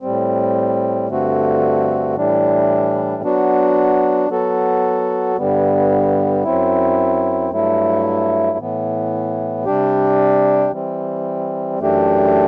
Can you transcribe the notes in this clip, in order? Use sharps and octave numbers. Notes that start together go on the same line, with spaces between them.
A2 G3 C4
G2 D3 A3 C4 F#4
A2 E3 G3 D4
F#3 B3 D4 F#4
F#3 B3 F#4 A4
G2 D3 G3 B3
F#2 F#3 C4 E4
G2 F#3 A3 E4
A2 E3 B3
C3 G3 D4 G4
E3 G3 C4
F#2 E3 A3 D4 G4